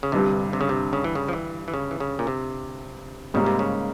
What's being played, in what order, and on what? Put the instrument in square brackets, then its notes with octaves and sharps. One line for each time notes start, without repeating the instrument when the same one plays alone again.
[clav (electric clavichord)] C#3
[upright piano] G1 G2 G3 [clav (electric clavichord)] C3
[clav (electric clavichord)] C3
C#3
C3
C#3
E3
C#3
F3
E3
E3
C#3
E3
C#3
A#2
C3
[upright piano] G#2 G3 A#3 [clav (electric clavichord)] C#3
[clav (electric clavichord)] C3
C#3